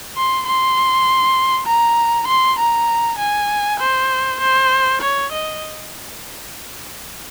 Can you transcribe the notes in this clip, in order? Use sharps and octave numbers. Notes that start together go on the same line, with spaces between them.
C6
C6
A#5
C6
A#5
G#5
C5
C5
C#5
D#5